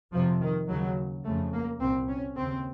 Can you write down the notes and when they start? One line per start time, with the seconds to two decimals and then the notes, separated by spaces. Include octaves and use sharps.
0.12 F2 C3 F3
0.41 D#3
0.68 D#2 C#3 F#3
1.24 F2 C#3 A3
1.53 A#3
1.80 C2 A#2 C4
2.08 C#4
2.36 D#2 C#3 C4